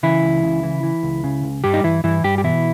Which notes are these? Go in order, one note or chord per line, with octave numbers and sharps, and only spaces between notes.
C#3 E3 E4
C#2
C#3
E3
E3
C#2
C#3
C#2
G2 G3 G4
D#4
G2 E3 E4
G2 E3 E4
G2 G3 G4
G4
B2 E3 E4